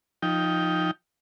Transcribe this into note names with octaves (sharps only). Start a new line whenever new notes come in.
F3 D#4 G5